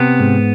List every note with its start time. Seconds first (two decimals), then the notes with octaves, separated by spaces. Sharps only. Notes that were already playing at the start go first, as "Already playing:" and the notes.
Already playing: C3 B3
0.20 G#2